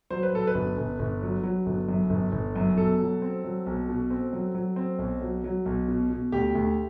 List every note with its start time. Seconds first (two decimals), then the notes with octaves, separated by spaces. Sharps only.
0.10 F#3 C5
0.23 B4
0.33 F#3 A4
0.47 B4
0.55 G1
0.77 G1
0.99 G1
1.22 F#3
1.44 F#3
1.66 G1
1.89 F#2
2.10 G1
2.32 G1
2.56 F#2
2.77 B2 A4
3.00 F#3
3.22 C4
3.44 F#3
3.66 B1
3.89 B2
4.10 C4
4.33 F#3
4.55 F#3
4.76 C4
4.99 B1
5.22 F#3
5.44 F#3
5.66 B1
5.88 B2
6.10 B2
6.32 D2 G4
6.55 D2